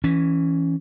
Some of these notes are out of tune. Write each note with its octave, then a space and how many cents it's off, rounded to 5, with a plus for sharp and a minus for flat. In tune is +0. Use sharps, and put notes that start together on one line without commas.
E3 +0 C#4 +0